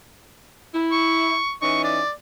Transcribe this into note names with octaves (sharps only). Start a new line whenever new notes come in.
E4
C#6
E3 C#4 D#4 C#6
D5